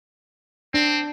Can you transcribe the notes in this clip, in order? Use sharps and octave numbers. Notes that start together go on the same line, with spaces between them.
C4 D4